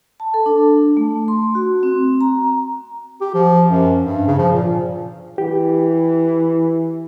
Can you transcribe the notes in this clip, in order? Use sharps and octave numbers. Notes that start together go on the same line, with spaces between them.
A5
A4
D4
A3
C6
F#4
C4
A#5
G4
F3
F#2
G2
C#3
F3
A#2
E3 G4